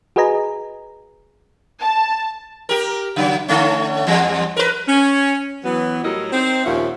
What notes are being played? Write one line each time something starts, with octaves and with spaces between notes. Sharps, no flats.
F#4 G#4 B4 D#5 G#5 A#5
A5
G4 A#4
C#3 F#3
D3 A3 C#4
E2 G3
A#4 B4
C#4
E3 F#3 B3
A2 F#3 G3 A4 A#4 D#5
C4 D#4 C5
D#2 A#2 F3 C#4 E5 F#5